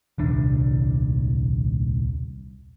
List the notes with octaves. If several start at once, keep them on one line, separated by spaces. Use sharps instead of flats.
D#1 C2 D4